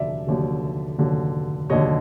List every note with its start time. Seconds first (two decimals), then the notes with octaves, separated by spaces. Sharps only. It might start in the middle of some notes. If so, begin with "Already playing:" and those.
Already playing: F1 D#2 D3 F#3 D5 E5
0.27 F1 D#2 D3 F#3
0.99 F1 D#2 D3 F#3
1.70 F1 D#2 D3 F#3 C#5 D#5